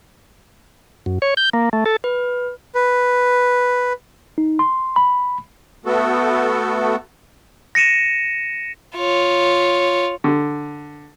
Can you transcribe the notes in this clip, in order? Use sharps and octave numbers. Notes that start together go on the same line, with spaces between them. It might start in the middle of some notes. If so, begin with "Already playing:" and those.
F#2
C#5
G6
A#3
A3
A4
B4
B4
D#4
C6
B5
A3 B3 F#4 A4
A#6 C#7 D#7 E7
F4 C#5
D3